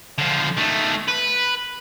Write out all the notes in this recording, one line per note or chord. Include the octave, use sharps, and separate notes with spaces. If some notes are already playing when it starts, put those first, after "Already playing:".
D3 F3
D#3 A3
B4